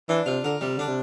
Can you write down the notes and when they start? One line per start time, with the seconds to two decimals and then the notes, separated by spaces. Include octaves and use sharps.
0.09 E3 D4
0.26 C3 F4
0.44 D3 A#4
0.61 C3 G3
0.77 D3 D4
0.88 C3